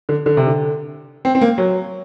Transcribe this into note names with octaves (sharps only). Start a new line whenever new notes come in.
D3
D3
C3
D3
C4
C4
A#3
F#3